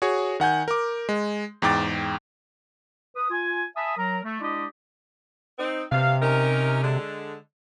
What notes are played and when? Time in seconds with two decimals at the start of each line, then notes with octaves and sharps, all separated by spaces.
0.02 F#4 G#4 C#5
0.40 D#3 F#5 G#5 G6
0.68 A#4 D6
1.09 G#3
1.62 E2 G#2 G5 D6 A6
3.15 B4 D#6
3.30 F4 G#5
3.77 E5 G#5 A5 B5 D#6
3.97 F#3 A#4 A#5
4.24 A3
4.41 G#3 D4 E4 G4 D5 D#5
5.59 C4 D#4
5.92 G2 C3 F5
6.22 C#4 D#4 A#4
6.83 D3 G#3